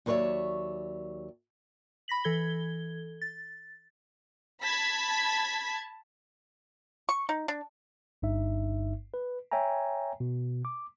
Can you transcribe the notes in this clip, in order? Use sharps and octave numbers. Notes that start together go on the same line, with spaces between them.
D#2 F#3 B4 C#5 D5 E5
B5 A#6 B6 F#7
E3 A4 G#6 G7
A6
A5 B5 G#6 B6
C#6
D#4
D4
G1 G2 D#4 E5
B4
C#5 E5 G5 G#5 A#5
B2
D6